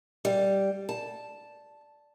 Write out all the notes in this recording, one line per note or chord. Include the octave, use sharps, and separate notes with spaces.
G3
A5